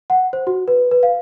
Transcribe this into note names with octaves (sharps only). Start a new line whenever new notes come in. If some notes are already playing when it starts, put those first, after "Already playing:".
F#5
C5
F#4
B4
B4
F5